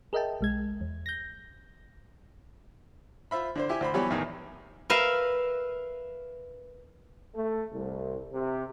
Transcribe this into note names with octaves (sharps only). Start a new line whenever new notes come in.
G#4 A#4 D#5 E5 G5 A5
B1 G#3 G#6
E2
G6 A#6
F4 C5 E5 B5
D3 D4 C5
E4 G4 E5 G#5
D2 C5 B5
E3 F#3 G3 B3 G4 C#5
E2 A2 D#3 E3
A#4 B4 E5 F5
A3
C2
C3